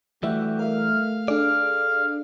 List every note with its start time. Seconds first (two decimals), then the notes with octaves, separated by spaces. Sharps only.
0.23 E3 G3 A3 F#4 G4 E5
0.59 A#4 E5 F5 F6
1.28 D4 G#4 A4 D5